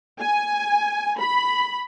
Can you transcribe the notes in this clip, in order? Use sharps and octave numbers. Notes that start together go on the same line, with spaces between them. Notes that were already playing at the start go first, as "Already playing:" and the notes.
G#5
B5